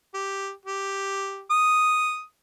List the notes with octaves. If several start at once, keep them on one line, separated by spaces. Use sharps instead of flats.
G4
G4
D#6